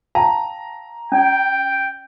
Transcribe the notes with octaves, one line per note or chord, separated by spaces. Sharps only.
F5 G5 A5 A#5
C#4 D5 G5